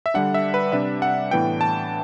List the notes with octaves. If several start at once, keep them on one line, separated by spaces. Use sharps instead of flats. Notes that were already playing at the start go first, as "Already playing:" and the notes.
E5
D3 G3 D4 F#5
E5
B4
C3 G3 D4 E5
F#5
A2 E3 B3 D4 G5
A5